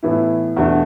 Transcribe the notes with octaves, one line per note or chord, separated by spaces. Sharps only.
A2 E3 B3 E4
E2 B2 A3 D4